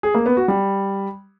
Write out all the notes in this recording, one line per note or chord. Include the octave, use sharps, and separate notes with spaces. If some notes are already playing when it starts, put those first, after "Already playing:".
G#4
A#3
B3
F#4
G3